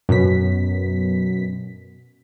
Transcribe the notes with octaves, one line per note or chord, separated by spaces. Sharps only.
F#2 B2 B6